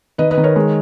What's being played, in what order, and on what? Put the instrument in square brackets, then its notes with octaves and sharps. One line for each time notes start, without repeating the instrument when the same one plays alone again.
[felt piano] D#3 B4 D#5
B4 D#5
D#3
A#4 C#5
G#3